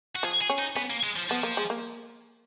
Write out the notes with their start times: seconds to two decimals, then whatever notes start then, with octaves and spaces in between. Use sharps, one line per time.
0.15 F#4
0.23 F3 G#4
0.41 G#4
0.50 C#4
0.58 D#4
0.76 B3 C#4
0.90 A#3
1.03 G#3
1.16 F3
1.30 F3 B3
1.43 A#3
1.57 G#3
1.70 A#3